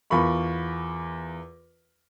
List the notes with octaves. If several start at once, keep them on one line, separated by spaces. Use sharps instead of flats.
E2 F4 A#4 B5 C#6